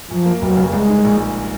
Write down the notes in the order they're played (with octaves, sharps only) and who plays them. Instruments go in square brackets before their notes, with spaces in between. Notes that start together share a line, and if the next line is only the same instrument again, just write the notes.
[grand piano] F#2 [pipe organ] F3
[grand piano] A#3
[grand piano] F1 [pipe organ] F#3
[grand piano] C#3
[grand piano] C2 [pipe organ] G#3
[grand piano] D#3
A#1
G#3